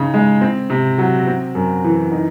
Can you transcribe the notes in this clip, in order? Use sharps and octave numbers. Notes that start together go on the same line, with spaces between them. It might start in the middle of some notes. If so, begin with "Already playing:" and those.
Already playing: C#3 D#4
G#3
C4
C3
F#3
C4
F#2
E3
D#4